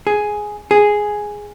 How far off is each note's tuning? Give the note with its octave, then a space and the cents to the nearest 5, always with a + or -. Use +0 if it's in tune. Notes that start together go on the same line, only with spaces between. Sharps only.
G#4 +5
G#4 +0